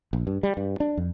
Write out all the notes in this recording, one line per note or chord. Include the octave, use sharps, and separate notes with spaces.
A#1
G2
G3
G2
D4
F2